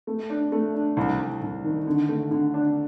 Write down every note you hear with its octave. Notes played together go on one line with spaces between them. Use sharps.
A3
D4
A3
D4
C2
C2
C2
D#3
D3
A3
D3
D4